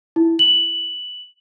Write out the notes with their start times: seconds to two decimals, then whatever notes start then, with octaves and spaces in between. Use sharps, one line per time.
0.16 E4
0.39 F#7